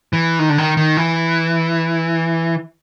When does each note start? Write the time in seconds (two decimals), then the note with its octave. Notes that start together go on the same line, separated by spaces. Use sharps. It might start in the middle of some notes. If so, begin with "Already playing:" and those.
0.13 E3
0.39 D#3
0.50 D3
0.58 D#3
0.77 D#3
0.97 E3